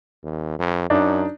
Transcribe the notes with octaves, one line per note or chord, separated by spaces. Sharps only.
D#2
F2
F#2 D4 D#4